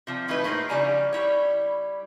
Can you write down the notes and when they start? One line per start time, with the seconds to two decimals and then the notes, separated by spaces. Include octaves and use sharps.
0.07 C3 F3
0.28 D#3 E3 A3 D#4 E4 B4
0.44 A2 A#3 D#4 F4 C5
0.69 C#3 F3 G3 D5 G#5 A#5
1.13 G3 E4 C#5